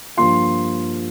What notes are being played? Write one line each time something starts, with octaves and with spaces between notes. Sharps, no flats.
G2 F3 A#3 F4 C6